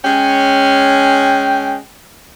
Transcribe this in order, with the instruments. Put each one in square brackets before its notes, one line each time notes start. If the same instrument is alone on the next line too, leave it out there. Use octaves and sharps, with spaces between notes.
[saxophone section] G#3 C#4 [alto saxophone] G5